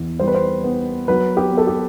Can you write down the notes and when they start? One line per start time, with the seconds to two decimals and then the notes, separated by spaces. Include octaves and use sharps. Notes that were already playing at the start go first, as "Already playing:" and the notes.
Already playing: E2
0.20 G3 C5
0.27 B4
0.34 C5
0.64 B3
1.08 F#3 B4
1.37 G4
1.52 B3
1.58 A4
1.67 G4